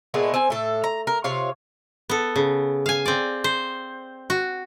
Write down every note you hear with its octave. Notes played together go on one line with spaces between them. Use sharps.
A#2 G#3 A3 B3
C4 G#5
A2 A4
A#5
A#4
C3 F4 C#5 F5
B3 A4
C#3
F5 G#5
C4 D5
C5
F#4